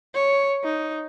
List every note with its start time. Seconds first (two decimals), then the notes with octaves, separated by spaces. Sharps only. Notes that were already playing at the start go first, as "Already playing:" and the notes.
0.15 C#5
0.64 D#4